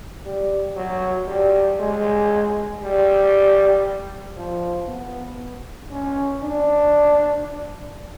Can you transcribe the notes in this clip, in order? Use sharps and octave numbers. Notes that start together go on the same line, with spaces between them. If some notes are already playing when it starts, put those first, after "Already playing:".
G3
F#3
G3
G#3
G3
F3
B3
C#4
D4